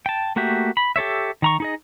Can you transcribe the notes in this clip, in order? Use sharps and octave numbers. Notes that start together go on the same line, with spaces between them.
G5 A5
A3 A#3 F#4 G4 E5
B5
G4 A4 C#5 E5
D#3 A#5 C#6
D#4 G#4 D#5